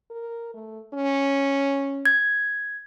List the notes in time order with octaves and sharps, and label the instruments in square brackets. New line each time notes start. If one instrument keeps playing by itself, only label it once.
[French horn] A#4
A3
C#4
[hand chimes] G#6